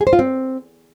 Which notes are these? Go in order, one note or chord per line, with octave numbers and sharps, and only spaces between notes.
G#4
C5
F4
C4